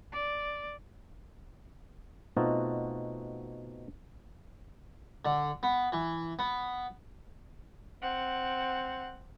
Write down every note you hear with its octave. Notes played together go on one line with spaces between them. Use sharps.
D5
B2 A3 C4 D#4 F4 F#4
D3
B3
E3
B3
C4 F#5